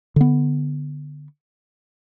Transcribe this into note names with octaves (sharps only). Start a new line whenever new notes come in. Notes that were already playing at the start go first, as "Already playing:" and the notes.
D3 B3